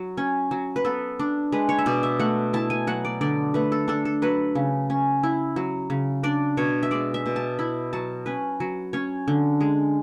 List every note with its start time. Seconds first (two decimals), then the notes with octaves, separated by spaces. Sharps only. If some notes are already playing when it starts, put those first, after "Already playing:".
Already playing: F#3
0.17 C#4
0.51 F#3
0.76 B4
0.85 B3 A4
1.19 D4
1.52 G#3 B4
1.69 C#5
1.78 E5
1.86 B2 D5
2.03 E5
2.20 A3 F#5
2.53 E4 A5
2.70 G#5
2.87 F#3 F#5
3.05 D5
3.21 D3 D5
3.54 A3 B4
3.72 A4
3.88 D4 A4
4.05 A4
4.22 F#3 B4
4.55 C#3
4.90 C#4
5.23 E4
5.56 F#3
5.90 C#3
6.23 D4 D5
6.57 B2 C#5
6.83 E5
6.91 G#3 D5
7.14 E5
7.26 B2
7.36 A5
7.59 E4 B5
7.93 F#3 A5
8.26 C#4 B4
8.60 F#3
8.93 C#4 C#5
9.28 D3
9.61 G#3